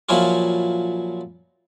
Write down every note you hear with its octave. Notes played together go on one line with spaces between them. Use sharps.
A#2 F3 F#3 C#4 E4 F4